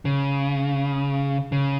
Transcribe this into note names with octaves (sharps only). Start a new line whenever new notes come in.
C#3
C#3